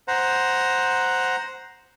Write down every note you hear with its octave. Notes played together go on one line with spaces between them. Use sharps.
C5 F#5 A#5